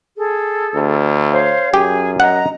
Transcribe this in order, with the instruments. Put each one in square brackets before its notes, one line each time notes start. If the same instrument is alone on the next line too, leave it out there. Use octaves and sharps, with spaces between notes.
[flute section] G#4 A4
[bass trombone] D2
[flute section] C5 C#5 F5
[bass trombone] F#2 [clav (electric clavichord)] G4 [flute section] G#4 G#5
[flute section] D#5 A#5 [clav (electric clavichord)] F#5